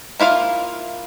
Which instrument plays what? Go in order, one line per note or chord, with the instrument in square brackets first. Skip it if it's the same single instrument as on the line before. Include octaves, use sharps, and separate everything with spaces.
[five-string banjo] A#3 E4 F4 F5